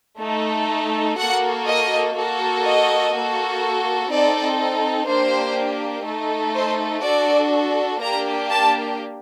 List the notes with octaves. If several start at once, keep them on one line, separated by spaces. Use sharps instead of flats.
A3 D#4 A4
A#3 F#4 A4 F#5
D#5
A#3 F#4 A4
D#5
A#3 F#4 A4
C4 D#4 A4 D5
A#3 D4 G4 C5
A3 D#4 A4
C5
D4 F#4 A4 D5
A#3 D4 G4 A#5
A5